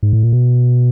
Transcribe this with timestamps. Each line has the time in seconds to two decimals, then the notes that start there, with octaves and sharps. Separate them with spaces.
0.03 G#2
0.13 A2
0.23 A#2
0.33 B2